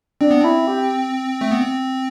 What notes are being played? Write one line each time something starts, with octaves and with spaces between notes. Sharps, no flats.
C4 D4
B3
C4 E4
G4
A3
B3
C4